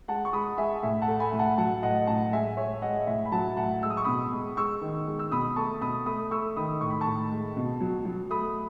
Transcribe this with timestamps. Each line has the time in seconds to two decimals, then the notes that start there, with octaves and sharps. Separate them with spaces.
0.08 G#3 F#5 A5
0.25 C#6
0.33 G#3 B5 D#6
0.58 G#3 E5 G#5
0.83 A2 E5 G#5
1.02 F#5 A5
1.08 A3
1.20 G#5 B5
1.33 A2
1.39 F#5 A5
1.58 F#3 F#5 A5
1.83 A2 D#5 F#5
2.07 A2 F#5 A5
2.32 G#3 E5 G#5
2.57 G#3 C#5 E5
2.82 G#3 D#5 F#5
3.07 A2 E5 G#5
3.25 B5
3.32 F#3 F#5 A5
3.57 A2 F#5 A5
3.83 G#3 E6
3.90 D#6
3.97 C#6
4.04 B2 B5 D#6
4.32 G#3
4.57 G#3 C#6 E6
4.81 D#3
5.07 G#3
5.19 E6
5.31 B2 B5 D#6
5.56 A3 A5 C#6
5.81 B2 B5 D#6
6.06 A3 B5 D#6
6.31 A3 C#6 E6
6.57 D#3 B5 D#6
6.81 A2 C#6
6.90 B5
7.01 A5 C#6
7.07 A2
7.31 G#3
7.57 B2
7.81 F#3
8.05 F#3
8.30 A3 B5 D#6